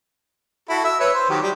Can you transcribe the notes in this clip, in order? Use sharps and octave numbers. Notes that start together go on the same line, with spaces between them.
E4 F#4 A4
E5 E6
B4 C#5 E5
C5
D#3 F#3 G4
G3